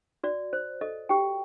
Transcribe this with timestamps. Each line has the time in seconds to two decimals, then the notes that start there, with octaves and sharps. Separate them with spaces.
0.24 F#4 D5
0.53 C5
0.81 A4 D#5
1.09 F#4 G4 G5